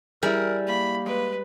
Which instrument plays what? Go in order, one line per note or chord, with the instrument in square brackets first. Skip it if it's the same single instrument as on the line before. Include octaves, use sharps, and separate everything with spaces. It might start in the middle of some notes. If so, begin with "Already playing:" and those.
[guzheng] G3 [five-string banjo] E4 G#4 [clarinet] A#4
[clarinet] A#3 [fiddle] B5
[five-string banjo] G#3 [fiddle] B4